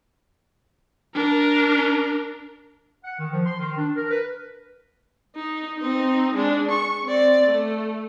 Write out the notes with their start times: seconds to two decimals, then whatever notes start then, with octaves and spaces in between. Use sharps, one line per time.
1.15 D4 A#4
3.04 F#5
3.19 D#3
3.32 F3
3.46 C6
3.59 D#3
3.78 D4
3.96 A#4
4.11 B4
5.36 D#4
5.79 C4 D#4
6.35 G#3 D4
6.70 C#6
7.05 C4 D5
7.46 A3